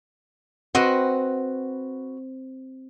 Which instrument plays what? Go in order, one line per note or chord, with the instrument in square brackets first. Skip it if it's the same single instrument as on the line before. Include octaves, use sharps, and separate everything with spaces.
[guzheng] C4 D#5 F#5 [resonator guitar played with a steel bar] F#4 B4